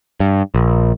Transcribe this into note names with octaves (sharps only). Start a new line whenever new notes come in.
G2
A#1